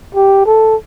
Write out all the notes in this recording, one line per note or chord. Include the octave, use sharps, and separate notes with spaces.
G4
A4